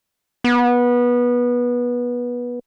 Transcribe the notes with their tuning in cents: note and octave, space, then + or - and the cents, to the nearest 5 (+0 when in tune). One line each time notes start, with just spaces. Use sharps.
B3 -20